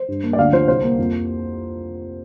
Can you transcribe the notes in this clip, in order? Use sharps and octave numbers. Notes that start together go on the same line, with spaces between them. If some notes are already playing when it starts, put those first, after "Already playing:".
Already playing: C5
G2
A#3
D5
D2 F5
F3 C5
C2 C5
A#3
F2